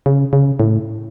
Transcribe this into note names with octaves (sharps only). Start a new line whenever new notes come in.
C#3
C#3
A2